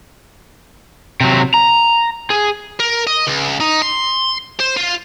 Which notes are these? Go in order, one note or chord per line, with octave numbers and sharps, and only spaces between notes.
C3 F#3
A#5
G#4
A#4
D#5
C#2
D#4
C6
C5
F4